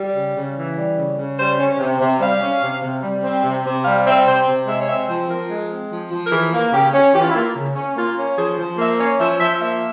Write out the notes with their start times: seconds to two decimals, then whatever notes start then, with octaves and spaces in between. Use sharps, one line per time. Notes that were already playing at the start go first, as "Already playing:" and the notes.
Already playing: G3
0.14 C#3
0.35 C#3
0.56 E3
0.76 G3
0.97 C#3
1.17 C#3
1.38 G3 C5
1.58 C#4
1.79 C3
2.00 C3
2.20 G3 F5
2.41 C#4
2.62 C3
2.82 C3
3.03 G3
3.23 C4
3.43 C3
3.64 C3
3.84 G3 F5
4.05 C4 E5
4.26 C3 C5
4.47 C3
4.67 G#3 E5
4.79 C#5
4.88 C4 E5
5.08 F3 C5
5.29 F3 A#4
5.49 G#3
5.70 C4
5.90 F3
6.11 F3
6.25 A#4
6.31 E3 G#4
6.52 A#3
6.72 C#3 G4
6.93 C#4
7.13 E3 G4
7.21 F4
7.29 E4
7.34 A#3 F4
7.55 C#3
7.75 C#4
7.96 A#3 F4
8.17 C#4
8.37 F3 G#4
8.58 F3
8.78 A#3 E5
8.99 C#4 C#5
9.19 F3 E5
9.40 F3 E5
9.60 A#3 E5